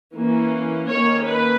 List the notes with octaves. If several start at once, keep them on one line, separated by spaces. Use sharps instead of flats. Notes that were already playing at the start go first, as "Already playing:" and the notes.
E3 A#3 C#4
D#3 A#3 C#4 C#5
B4